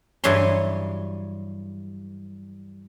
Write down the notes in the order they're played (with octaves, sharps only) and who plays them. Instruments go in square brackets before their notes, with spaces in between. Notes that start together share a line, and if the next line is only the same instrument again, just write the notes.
[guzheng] G2 E3 F#3 C#5 C6